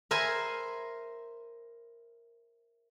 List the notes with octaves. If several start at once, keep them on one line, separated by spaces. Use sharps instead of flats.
A#4 C5 E5 G#5 B5